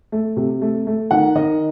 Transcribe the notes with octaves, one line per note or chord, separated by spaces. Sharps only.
A3
C3
A3
A3
D#3 F#5
D#3 D#5